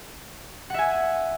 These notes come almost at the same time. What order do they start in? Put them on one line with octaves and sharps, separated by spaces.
F#5 E5 G#5